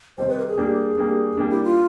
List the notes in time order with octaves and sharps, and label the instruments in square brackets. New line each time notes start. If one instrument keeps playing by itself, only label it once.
[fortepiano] C3 D#3 G3 [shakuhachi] C5
[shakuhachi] B4
A#4
G#4
[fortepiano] G3 A#3 D4
G3 A#3 D4
G3 A#3 D4
[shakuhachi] E4
F4